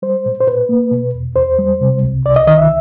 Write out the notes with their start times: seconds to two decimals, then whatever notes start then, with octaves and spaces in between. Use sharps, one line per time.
0.02 G3 C5
0.26 A#2
0.40 C5
0.47 A#2 B4
0.69 A#3
0.91 B2
1.14 E2
1.36 E2 C5
1.59 G3
1.81 C3
2.03 C2
2.26 C2 D5
2.36 D#5
2.47 D#3 D#5
2.58 E5